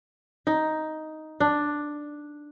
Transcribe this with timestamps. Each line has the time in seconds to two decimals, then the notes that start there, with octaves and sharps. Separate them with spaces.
0.47 D#4
1.40 D4